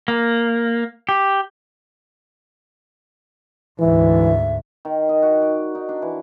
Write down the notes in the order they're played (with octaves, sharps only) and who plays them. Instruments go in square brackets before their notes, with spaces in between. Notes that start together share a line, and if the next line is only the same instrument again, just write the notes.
[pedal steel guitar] A#3
G4
[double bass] D2 G#2 [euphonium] E3 [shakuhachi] E5
[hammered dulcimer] D#3
D#5
F#4
D5
D#4
D4
E3